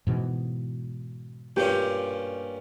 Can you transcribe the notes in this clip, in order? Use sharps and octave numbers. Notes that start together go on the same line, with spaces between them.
G#2 B2 E3
G2 A#2 C#4 G4